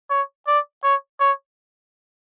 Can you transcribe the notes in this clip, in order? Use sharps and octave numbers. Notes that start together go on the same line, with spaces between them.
C#5
D5
C#5
C#5